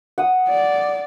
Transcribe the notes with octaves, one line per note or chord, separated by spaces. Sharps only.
F#5 D#6
D5